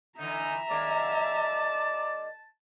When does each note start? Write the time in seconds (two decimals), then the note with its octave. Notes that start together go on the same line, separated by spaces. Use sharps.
0.19 D3 E3 D#4 E5 A#5
0.70 D#3 G#3 A#3 D5 A5